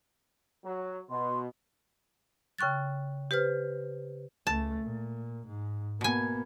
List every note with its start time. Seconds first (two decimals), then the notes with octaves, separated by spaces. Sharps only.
0.65 F#3
1.10 B2 C6
2.58 C#3 G5 C#6 F#6 A6
3.31 G4 B4 C5 F6
4.47 C#2 A3 A5
4.84 A#2
5.47 G#2
6.01 B2 A#3 B3 G#5